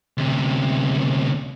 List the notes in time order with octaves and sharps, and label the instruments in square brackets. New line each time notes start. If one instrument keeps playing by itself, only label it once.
[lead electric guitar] D2 C3